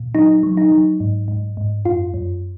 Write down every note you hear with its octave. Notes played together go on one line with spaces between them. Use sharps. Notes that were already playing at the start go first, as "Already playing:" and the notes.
Already playing: A#2
F#3 D#4
F#3
D#4
F#3
G#2
G#2
G#2
F#2 F4
F#2